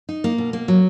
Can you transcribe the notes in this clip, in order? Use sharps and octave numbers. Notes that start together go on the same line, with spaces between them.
D#4
A#3
B2
A#3
F#3